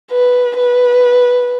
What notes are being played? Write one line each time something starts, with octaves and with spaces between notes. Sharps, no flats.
B4
B4